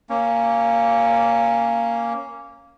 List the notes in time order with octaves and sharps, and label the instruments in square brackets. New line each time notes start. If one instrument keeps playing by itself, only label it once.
[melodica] A#3 C#4